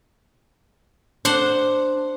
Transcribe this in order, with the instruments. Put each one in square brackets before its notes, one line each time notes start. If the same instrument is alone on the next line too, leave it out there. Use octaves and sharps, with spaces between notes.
[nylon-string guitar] D4 [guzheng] C5 F#5